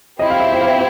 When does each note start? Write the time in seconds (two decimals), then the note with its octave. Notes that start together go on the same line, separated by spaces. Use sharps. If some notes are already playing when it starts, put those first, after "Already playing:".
0.19 C4 E4 G4 C5 D#5
0.30 F5
0.40 E5
0.52 E5
0.61 F5